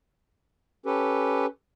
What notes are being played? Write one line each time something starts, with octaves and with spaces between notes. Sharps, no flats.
C#4 G4 A4 B4